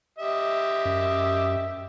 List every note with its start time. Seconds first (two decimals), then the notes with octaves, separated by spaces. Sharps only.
0.19 G4 D#5 E5
0.85 F#2